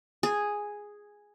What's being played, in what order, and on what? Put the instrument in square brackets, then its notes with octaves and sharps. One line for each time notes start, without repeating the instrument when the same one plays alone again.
[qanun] G#4